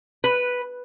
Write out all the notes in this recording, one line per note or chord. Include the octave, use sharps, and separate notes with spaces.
B4